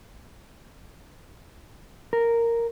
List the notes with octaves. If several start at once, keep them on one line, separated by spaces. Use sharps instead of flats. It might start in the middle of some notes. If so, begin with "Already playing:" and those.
A#4